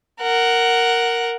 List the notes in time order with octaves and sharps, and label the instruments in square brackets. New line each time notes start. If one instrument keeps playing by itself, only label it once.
[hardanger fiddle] A#4 F#5